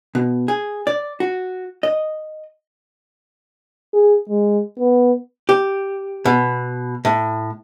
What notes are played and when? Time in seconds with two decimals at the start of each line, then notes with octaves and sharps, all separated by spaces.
0.15 B2
0.48 G#4
0.87 D5
1.20 F#4
1.83 D#5
3.94 G#4
4.29 G#3
4.79 B3
5.49 G4
6.25 B2
7.05 A2